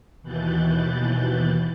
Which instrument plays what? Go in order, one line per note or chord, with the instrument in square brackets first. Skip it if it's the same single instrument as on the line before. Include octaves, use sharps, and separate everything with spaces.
[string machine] D#2 B2 E3 F#6 G6 A6